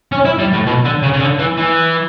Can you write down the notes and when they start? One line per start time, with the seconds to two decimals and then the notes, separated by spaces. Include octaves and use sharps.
0.12 C#4
0.25 E4
0.39 G3
0.53 A2
0.67 B2
0.85 D3
1.03 C#3
1.13 C#3
1.20 D3
1.39 E3
1.57 E3